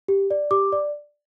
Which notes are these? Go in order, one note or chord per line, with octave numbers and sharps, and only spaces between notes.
G4
D5
G4 D6
D5